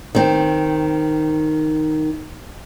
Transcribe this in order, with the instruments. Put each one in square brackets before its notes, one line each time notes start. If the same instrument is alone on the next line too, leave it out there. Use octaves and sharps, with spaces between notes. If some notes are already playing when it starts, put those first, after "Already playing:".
[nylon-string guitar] D#3 C4